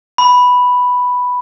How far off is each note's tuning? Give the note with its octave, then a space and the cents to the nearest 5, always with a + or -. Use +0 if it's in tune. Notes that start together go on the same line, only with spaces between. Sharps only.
B5 +0